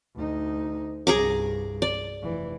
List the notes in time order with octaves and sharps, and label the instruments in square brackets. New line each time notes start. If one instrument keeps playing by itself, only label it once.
[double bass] D2 D#4
[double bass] C2 G2 [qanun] G#4 A#5 D6
[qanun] D5
[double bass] F1 E3